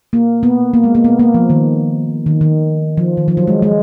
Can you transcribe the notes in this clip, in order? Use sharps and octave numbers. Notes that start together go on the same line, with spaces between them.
A#3
B3
A#3
G#3
A#3
B3
A#3
F3
D#3
D#3
D#3
F3
D#3
F3
F#3
G#3
G#3